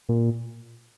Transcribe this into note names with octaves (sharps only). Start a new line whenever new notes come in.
A#2